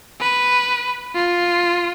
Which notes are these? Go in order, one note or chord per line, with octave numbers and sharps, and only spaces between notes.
B4
F4